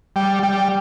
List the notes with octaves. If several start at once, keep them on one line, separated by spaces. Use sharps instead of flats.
G3
G3